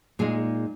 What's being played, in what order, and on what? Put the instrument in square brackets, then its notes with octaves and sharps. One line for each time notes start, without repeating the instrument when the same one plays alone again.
[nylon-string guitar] A#2 G#3 D#4 G#4